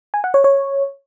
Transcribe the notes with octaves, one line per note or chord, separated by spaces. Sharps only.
G#5
F#5
C#5
C#5